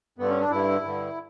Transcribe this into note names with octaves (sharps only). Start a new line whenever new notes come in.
G2 D3 B3
C#4
D4
G2 D3 E4
G2 D3